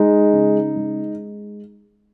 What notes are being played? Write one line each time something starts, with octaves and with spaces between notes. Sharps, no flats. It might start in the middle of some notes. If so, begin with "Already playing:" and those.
Already playing: G#3 D#4
C#3
G#3